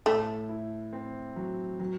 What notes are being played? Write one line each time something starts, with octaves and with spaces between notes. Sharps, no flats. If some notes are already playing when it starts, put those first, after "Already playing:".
A2 A3
E4
C4
F#3
F#3